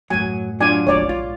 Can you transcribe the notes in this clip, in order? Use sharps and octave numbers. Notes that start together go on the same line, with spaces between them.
F#2 A2 F#3 G#5
F#3 D4 F4 D5 G#5
F1 A#1 D#3 C#5 D5
G#2 F4